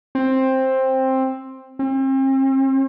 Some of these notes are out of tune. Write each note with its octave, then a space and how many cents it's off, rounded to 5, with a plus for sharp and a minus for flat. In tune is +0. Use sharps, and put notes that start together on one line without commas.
C4 +10
C4 +40